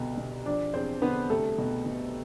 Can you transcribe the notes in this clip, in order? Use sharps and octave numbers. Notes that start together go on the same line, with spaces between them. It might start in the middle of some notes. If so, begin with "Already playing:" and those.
Already playing: C2 B2 D3
B2
F3 D4 D5
E2 C4 C5
D3 B3 B4
C2 A3 A4
B2
B2